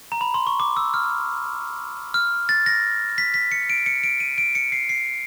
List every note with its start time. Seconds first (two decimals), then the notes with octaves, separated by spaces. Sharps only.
0.12 A#5
0.21 B5
0.34 C6
0.47 C#6
0.60 D6
0.77 E6
0.94 F6
2.14 F6
2.49 A6
2.66 A#6
3.18 B6
3.34 B6
3.52 C#7
3.70 D7
3.86 C#7
4.04 D7
4.20 D#7
4.38 D7
4.55 C#7
4.72 C7
4.89 C7